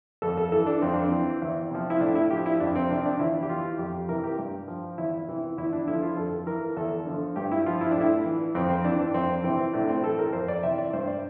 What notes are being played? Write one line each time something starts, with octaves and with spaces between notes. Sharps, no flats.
F2 A4
A4
E3 A4
D4
F2 C4
D4
C4
E3
E2
C3 F3
E4
A2 D4
E4
F3 G4
E4
F2 D4
C4
C3 F3 D4
D4
E2 E4
G4
E3 F4
F2 G4
C3 E3 A#4
G4
G2
F3
E2 E4
C3 E3
E2 E4
D4
D3 F3 E4
F4
F2 A4
E3 A#4
E2 A4
D3 F3
G2 G4
E4
F3 F4
E4
A2 D4
E4
E3
F2 C4
C4
E3 D4
D4
F2 C4
C3 E3 C4
A2 D4
C4
E3 A4
A#4
F2 C5
D5
C3 E3 E5
D5
G2 C5
D5